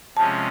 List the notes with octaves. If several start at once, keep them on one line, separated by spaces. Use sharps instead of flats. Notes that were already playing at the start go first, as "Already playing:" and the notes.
C3 F3 G#3 C#4 A5